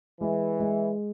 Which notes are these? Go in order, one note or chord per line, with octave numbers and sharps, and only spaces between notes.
E3 G#3
G#3